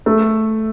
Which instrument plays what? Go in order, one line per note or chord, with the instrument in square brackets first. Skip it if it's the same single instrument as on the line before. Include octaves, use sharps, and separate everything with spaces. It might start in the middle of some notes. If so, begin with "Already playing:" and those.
[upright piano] A3